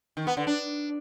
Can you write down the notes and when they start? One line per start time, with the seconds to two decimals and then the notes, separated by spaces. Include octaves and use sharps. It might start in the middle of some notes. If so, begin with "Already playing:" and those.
0.17 D#3
0.27 B3
0.37 D3
0.47 D4